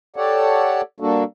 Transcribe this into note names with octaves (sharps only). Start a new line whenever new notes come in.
G4 A4 C#5 D5 F#5 A5
G3 A#3 D4 F#4 A4